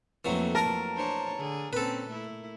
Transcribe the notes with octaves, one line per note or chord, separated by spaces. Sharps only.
F2 E3 F#3 A3 A#3
A#4 A5
D4 C5 C#5
D3 G#4
A#2 C4 C#4 A4 B4
A3 E4